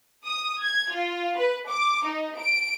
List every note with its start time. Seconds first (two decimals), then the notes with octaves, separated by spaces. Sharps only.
0.26 D#6
0.62 G#6
0.91 F4
1.37 B4
1.68 D6
2.05 D#4
2.37 D7